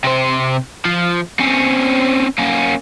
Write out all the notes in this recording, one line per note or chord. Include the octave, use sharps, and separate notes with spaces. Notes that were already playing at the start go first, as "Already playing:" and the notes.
C3 C5
F3
C4 C#4
A#3 C#4